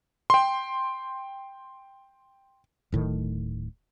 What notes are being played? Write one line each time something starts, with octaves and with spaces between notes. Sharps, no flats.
G5 C6
D1 A2 D#3